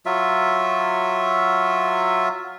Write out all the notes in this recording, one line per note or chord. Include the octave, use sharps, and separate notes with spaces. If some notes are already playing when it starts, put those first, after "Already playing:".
F#3 F4 E5